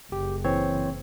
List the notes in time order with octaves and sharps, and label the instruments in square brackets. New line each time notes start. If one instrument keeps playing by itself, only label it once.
[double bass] F#1 [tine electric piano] G4
[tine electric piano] E3 C4 C#5